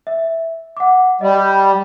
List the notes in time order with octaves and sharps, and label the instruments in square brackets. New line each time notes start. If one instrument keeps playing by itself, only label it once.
[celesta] E5
F#5 D6
[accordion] G3 [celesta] D#5 B5